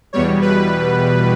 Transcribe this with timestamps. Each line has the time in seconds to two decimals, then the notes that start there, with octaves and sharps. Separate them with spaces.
0.13 E2 B2 G3 C#5
0.42 B4